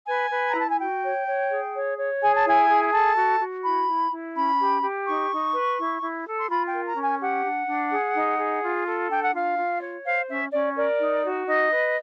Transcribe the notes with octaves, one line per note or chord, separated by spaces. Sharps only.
B4 G#5
B4
A#5
E4 A5
G#5
F#4 G5
C#5
C#5
G#4
C#5
C#5
G#4 G#5
A5
E4 G#5
G#4
A4 A5
F#4
F#4
E4 B5
E4
E4
C#4 B5
G4
G4
D#4 C#6
D#4
B4
E4
E4
A4
C6
F4 B5
G5
A#4
A#5
C#4
G#5
G4 F#5
D4
D4
G#4
D#4
G#4
F4
A4
D4 G5
F#5
F4 F5
F4
C#5
C5 F5
C#4 E5
C#4 D5
A#4 D5
D#4
F#4
D#4 D#5
B4